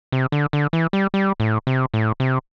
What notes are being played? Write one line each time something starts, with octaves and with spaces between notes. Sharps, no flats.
C3
D3
D3
E3
G3
G3
A2
C3
A2
C3